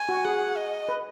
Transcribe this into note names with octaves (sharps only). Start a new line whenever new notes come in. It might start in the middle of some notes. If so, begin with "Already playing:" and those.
Already playing: G#5
F#4
G#4 F#5
D#5
B4